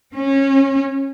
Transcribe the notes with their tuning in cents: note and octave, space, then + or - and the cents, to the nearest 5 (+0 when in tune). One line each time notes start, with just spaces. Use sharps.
C#4 -20